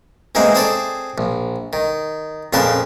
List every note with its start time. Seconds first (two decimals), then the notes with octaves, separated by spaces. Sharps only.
0.35 E3 G#3 A#3 C4 D#4
0.55 C4 G#4 A4 C#5 D5
1.18 A#1
1.73 D#3
2.53 F2 A#2 C#3 A#4 B4 A5